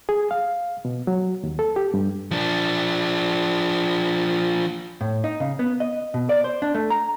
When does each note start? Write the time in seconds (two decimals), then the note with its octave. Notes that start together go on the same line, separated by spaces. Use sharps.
0.09 G#4
0.31 F5
0.85 B2
1.07 F#3
1.43 D#2
1.59 A4
1.76 G4
1.94 G2
2.31 F3 D4
5.01 A2
5.24 D#4
5.40 C#3
5.59 B3
5.80 D#5
6.14 B2
6.29 D5
6.44 C5
6.62 D4
6.75 A3
6.90 A#5